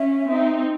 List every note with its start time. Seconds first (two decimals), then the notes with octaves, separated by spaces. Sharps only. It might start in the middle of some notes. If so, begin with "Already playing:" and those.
Already playing: C#4 E5
0.29 C4 D#4